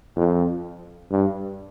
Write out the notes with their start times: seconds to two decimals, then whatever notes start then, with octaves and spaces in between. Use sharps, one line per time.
0.16 F2
1.11 G2